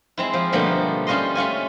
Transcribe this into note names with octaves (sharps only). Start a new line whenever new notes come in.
G#3 C4 E4
F3
B2 D3 F3 G3 A3 A#3
G3 C#4 F4 D#5 C6
A3 C#4 F4 G#5